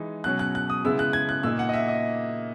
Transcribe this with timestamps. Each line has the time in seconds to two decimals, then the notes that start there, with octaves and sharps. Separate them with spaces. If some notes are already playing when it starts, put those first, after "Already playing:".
Already playing: E3 G#3 D#4
0.24 B2 F#3 C#4 F#6
0.39 F#6
0.55 F#6
0.70 D#6
0.85 C#3 G#3 B3 E4 E6
0.99 F#6
1.13 G#6
1.29 F#6
1.43 A#2 A#3 D#4 E6
1.59 F#5
1.69 D#5
1.73 E5
1.88 D#5